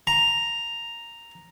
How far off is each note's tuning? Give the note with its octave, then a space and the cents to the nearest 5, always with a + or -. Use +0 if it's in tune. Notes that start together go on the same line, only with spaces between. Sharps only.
A#5 +0